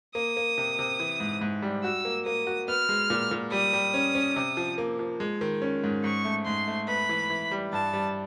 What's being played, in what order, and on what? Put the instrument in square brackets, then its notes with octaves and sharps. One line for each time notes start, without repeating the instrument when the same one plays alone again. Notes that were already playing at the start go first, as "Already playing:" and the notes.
[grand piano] A#3 [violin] D#6
[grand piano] A#3
C3
C3
E3
G#2
G#2
G3
[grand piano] F#4 [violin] E6
[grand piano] A#3
[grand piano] A#3 [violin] D#6
[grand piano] F#4
[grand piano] B3 [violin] F6
[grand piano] G#3
A#2
A#2
[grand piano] G3 [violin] D#6
[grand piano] G3
C#4
C#4
C3
F3
A#3
F3
G#3
D#3
C#4
G#2
[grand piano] G#2 [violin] C#6
[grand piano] A3
[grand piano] G#2 [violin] C6
[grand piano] A3
[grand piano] B3 [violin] B5
[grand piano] E3
E3
G3
[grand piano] G2 [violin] A5
[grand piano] G3